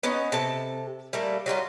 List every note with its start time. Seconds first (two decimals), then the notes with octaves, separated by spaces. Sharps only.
0.03 B3 C#4 D#4 C#5
0.32 C3 A4 A5
1.13 G3 A3 A#3
1.46 F#3 G3 D#4 F4